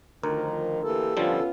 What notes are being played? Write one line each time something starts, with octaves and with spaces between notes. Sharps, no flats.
D2 D#3 F3 A#4
E3 A#3 G4 A4
D3 F3 G3 B3 C#4 F4